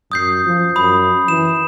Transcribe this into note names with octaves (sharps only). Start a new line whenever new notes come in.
F#2 D#6 G6 C7
F3
F#2 B5 D#6
E3 E7